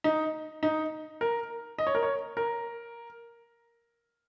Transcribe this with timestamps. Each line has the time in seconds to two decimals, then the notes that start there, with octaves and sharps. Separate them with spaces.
0.04 D#4
0.63 D#4
1.21 A#4
1.78 D#5
1.87 C#5
1.95 A#4
2.03 C#5
2.37 A#4